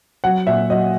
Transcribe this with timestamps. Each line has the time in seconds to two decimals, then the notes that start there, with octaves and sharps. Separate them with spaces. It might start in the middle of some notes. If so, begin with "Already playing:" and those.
0.24 F#3 F#5
0.47 A#2 E5
0.70 F#3 D#5